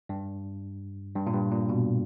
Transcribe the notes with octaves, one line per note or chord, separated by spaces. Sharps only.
G2
G2
A#2
G2
A#2
B2